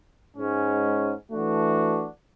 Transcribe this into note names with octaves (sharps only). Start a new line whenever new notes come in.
G#2 G#3 C#4
E3 A3 D4 F#4